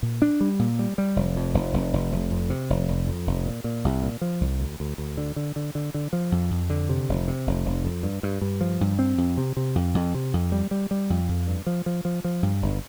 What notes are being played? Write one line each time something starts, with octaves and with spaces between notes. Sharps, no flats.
A#2
D4
G3
A#2
G3
G3
F1
F2
F1
F1
F1
F1
F2
C3
F1
F1
F2
F1
A#2
A#2
C2
A#2
F3
C2
D2
D2
D2
D3
D3
D3
D3
D3
F3
F2
F2
D3
C3
F1
C3
F1
F1
F2
G2
G2
G2
F3
G2
C4
F2
C3
C3
F2
F2
C3
F2
G3
G3
G3
F2
F2
G2
F3
F3
F3
F3
G2
G1